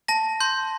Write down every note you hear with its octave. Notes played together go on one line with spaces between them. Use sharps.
A5 A#6
C6 G6